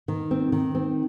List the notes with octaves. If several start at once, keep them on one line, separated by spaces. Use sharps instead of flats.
D#3
C4
D#3
C4